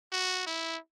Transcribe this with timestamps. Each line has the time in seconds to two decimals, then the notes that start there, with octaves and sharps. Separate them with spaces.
0.12 F#4
0.47 E4